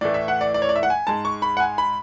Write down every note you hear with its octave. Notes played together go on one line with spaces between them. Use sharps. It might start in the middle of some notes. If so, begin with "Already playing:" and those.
A2 E3 A3 D5
E5
F#5
D5
D5
C#5
D5
E5
F#5
G#5
G#2 G#3 A5
C#6
B5
F#5
G#5
B5